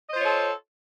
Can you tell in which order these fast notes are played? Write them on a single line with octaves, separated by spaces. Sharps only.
D#5 C5 F4 C#5 A4